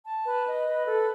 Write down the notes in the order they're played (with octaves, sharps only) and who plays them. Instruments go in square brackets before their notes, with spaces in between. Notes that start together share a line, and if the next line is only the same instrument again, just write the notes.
[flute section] A5
B4
D#5
B4
A4